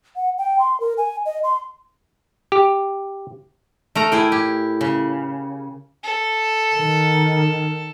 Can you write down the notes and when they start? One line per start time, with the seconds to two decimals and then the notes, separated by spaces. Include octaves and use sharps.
0.16 F#5
0.38 G5
0.59 C6
0.80 A#4
0.98 G#5
1.26 D#5
1.44 C6
2.52 G4
3.95 A3 A#4 A#5
4.12 A2 E4 G#4 G5
4.32 G4
4.81 C#3
6.03 A4
6.76 D#3